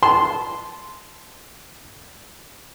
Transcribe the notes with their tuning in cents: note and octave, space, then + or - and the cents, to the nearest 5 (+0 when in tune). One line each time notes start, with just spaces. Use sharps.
A5 -20 C6 -10